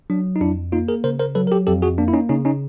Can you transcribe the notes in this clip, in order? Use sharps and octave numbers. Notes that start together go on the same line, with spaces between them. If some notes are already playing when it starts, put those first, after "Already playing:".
F#3 D4
D#4
F2 D4 E4
A#3 D#4 F4
G#4 A#4
C#3 A#4 C5
A#4 C5
F#3 A4 B4
A#4
G4 A4
F2 G4 A4
F#4 G#4
A#3 D4
E4
C#4 D#4
C#3 C#4 D#4
C#4 D#4